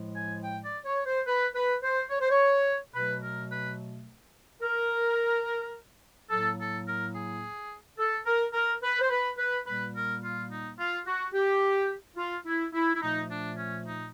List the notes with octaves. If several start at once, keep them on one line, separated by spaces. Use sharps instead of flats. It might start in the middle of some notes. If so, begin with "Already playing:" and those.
Already playing: A2 F3 G#3
G#5
G5
D5
C#5
C5
B4
B4
C5
C#5
C5
C#5
B2 F#3 A3 B4
A#4
B4
A#4
A2 F#3 A#3 A4
A4
A#4
G#4
A4
A#4
A#4
B4
C5
B4
B4
A#2 G3 A#3 B4
A#4
F4
D#4
F4
F#4
G4
F4
E4
E4
E4
A#2 F3 A3 D#4
D4
C#4
D#4